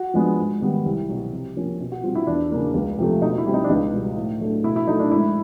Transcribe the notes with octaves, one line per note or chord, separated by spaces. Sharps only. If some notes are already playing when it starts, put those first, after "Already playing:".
Already playing: F#4
F3 G#3 B3 D4
G#2
D#3 G3 B3
C2
B2 F#3
C3
F3 A#3 C#4
B2
F#4
G3 C4 F4
E4
E2 D4
C#3 F#3 A#3 D4
C#2
C3 F3 A3
B2 D#4
E4
G3 C4
D#4
D4
C#2 D#4
B2 G3
A2
F#3 A3 D4
B2 E4
E4
F#3 A3 D#4
D4
G#2 E4